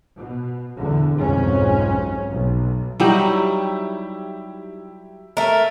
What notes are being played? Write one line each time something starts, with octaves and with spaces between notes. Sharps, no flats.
B2
E2 D3
B1 F2 G#2 C#4
B1
F#3 G3 D#4 E4 G4
A3 A#4